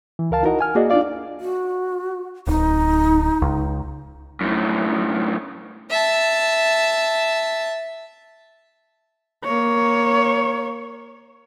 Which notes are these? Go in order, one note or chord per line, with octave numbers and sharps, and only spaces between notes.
E3
C#2 A#4 F5 A5
D#4 E4 F#4 A#4 D#5 F#5
G#5 F6
A#3 F#4 G#4 D5 D#5
D4 D#4 F4 D5 F5
F#4
D1 D#4
C#2
F#2 A2
E5 A5
A#3 C#5